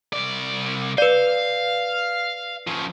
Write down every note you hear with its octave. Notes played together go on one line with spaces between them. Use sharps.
C2 D5
B4 D5 F5
F3 C#4